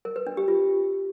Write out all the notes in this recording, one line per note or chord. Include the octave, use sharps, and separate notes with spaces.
A#4
B4
D4
G4
F4